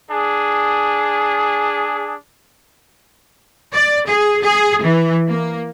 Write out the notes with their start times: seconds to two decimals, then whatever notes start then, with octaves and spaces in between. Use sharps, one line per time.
0.10 D4 G#4
3.73 D5
4.07 G#4
4.43 G#4
4.82 E3
5.29 A#3